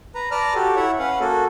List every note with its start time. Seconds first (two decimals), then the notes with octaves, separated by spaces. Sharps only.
0.15 B4 A#5
0.31 B4 D5 A5 A#5 F6
0.54 F#4 G4 A4
0.76 E4 C#5 E5 F#5
0.99 C#4 B4 F5 F#5
1.20 A#3 F#4 A4